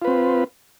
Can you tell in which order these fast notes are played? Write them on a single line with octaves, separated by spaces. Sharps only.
F4 B4 C4